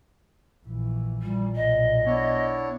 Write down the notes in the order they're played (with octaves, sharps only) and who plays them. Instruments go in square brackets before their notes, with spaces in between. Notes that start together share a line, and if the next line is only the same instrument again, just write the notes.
[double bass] A#1 E3
[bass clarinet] A#2 [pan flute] G3
[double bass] B1 [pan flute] D#5
[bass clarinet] B3 [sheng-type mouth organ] D4 E4 C#5